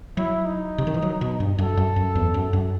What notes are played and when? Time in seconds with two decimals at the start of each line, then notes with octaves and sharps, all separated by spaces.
0.17 F#3 E4
0.45 D#4
0.78 C3
0.87 D#3
0.94 E3
1.02 F#3
1.21 B2
1.40 G2
1.58 F#2 A4
1.77 F#2
1.96 F#2
2.15 E2
2.34 F#2
2.53 F#2